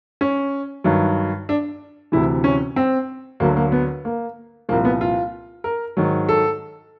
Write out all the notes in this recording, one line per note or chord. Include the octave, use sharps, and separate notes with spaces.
C#4
G2 D#3 F#3
D4
D2 C3 E3 E4
C#4
C4
D2 D3 F#3 A#3
A#3
B3
A#3
C2 A#2 F3 A#3
B3
F4
A#4
G#2 D#3 F#3
A4